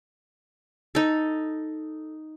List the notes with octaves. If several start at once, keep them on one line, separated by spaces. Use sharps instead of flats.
D#4 A4